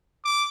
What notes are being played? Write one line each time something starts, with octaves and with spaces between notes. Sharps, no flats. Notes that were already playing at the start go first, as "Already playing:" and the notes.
D6